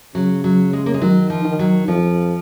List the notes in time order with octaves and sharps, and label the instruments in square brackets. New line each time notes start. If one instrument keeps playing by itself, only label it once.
[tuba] C#3 [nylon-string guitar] F#3
[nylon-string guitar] F#3
G#3
A#3
G#3
[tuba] D#3 [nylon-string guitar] F#3
[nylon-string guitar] F3
[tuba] D#3
[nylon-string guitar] F#3
[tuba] F2 [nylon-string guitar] F3